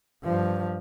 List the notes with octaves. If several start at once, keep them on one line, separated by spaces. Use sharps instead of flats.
G2 F3